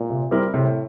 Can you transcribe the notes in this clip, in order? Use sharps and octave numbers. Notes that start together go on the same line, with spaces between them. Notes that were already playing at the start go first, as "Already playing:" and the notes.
Already playing: A#2
C3
G3 C4 E4 A#4
A2 C3